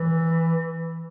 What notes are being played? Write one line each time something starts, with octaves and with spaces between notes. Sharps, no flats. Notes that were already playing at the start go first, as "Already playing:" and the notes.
Already playing: E3